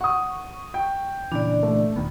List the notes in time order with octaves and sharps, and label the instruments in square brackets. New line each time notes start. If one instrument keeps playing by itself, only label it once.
[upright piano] F#5 D#6 [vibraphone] C#6
[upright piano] G5
[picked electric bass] A#2 C#3 E3 [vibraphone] D4 D5
[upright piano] A3
[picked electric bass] D#1 D#3 B3